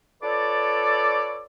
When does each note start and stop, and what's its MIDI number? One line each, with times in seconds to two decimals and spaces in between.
0.23 1.44 65
0.23 1.44 69
0.23 1.44 71
0.23 1.44 73
0.23 1.44 74